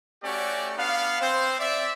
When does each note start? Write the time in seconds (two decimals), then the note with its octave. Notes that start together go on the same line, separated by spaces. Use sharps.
0.24 A3 C#4 F#4 G4 D5
0.77 B3 D4 F5
1.21 C4 C5
1.59 D5 E5